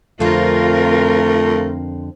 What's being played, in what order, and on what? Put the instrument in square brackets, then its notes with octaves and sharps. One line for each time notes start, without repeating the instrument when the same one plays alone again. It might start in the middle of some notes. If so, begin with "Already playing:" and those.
[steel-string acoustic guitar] F2 D3 C4 [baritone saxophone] A3 [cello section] F4 A#4